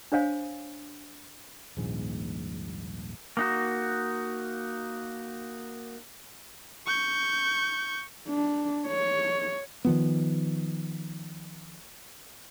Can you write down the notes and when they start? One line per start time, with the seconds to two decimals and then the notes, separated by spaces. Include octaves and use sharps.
0.12 D4 C5 C#5 F5 G#5
1.77 D#1 A#1 G#2 G#3
3.37 A#3 D#4 F#4
6.86 C#6 G6
8.29 D4
8.88 C#5
9.85 D#3 F3 B3